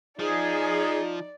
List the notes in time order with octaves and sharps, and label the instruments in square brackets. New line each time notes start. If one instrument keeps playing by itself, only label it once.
[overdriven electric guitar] F3 [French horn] D#4 [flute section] G#4 [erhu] D5